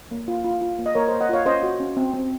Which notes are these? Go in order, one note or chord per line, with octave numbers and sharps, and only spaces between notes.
A#3
F4
F4
F4
A#3
D#5
A#3 A#4 C#5
A#3 C5 D#5
D#5 F#5
F4 C#5 F5
C#4 C5 D#5
F#4
C#4
C4
C4